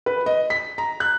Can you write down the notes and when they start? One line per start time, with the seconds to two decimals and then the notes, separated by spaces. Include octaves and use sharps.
0.06 B4
0.26 D#5
0.50 B6
0.78 A#5
1.00 F#6